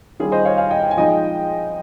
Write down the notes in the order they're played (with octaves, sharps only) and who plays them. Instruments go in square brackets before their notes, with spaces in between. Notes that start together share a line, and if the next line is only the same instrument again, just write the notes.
[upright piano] D#3 G3 C#4 F4 G#4
C5 D#5
C#5 F5
F5 G#5
D#5 G5
G5
G#5
F3 G#3 D#4 D#5 G5